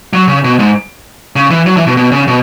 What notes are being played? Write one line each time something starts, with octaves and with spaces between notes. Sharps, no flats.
F#3
C#3
B2
G#2
C#3
E3
F#3
E3
B2
B2
C#3
B2